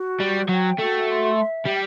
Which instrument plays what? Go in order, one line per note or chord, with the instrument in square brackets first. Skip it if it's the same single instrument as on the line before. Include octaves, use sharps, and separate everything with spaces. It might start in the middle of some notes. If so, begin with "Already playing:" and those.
Already playing: [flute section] F#4
[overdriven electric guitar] G3 [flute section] C5
[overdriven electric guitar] F#3 [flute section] G5
[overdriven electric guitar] A3 [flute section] F#4
[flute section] C6
E5
[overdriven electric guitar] G3 [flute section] G5